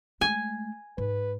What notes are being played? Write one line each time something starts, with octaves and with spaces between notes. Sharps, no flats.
G#3 A3 G#5
G#2 B4